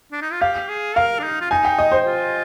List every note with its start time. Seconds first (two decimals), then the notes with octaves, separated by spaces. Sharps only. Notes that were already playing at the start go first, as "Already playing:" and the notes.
0.12 D4
0.22 D#4
0.32 F4
0.42 G4 F5
0.69 G#4
0.96 A#4 F5
1.19 D4
1.23 D#4
1.41 F4
1.51 D#4 G#5
1.65 G5
1.79 D#5
1.92 C5
2.06 F4